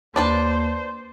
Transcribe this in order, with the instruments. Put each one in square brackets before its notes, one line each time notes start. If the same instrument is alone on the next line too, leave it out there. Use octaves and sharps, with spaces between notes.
[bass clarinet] D#2 [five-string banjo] D4 B4 A5 [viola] C5